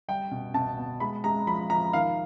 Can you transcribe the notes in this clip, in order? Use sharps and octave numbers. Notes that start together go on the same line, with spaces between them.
G3 G5
B2
B2 A5
B3
G#3 B5
G#3 A#5
F3 B5
F3 A#5
D#3 F5